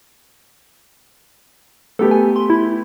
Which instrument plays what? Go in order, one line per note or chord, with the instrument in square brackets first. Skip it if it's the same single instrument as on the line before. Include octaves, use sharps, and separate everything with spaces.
[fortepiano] A3 B3 G4 [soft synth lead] A4
[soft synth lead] G#5
C6
E4